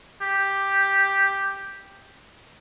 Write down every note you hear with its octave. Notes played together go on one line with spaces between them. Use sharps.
G4